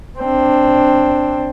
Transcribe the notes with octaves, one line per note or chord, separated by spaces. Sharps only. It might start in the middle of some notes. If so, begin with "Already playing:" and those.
C4 D4